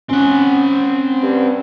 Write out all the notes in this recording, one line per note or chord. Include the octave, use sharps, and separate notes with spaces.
C4 C#4 F#5
G2